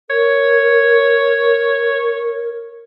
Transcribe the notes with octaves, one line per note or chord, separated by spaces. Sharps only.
A#4 C#5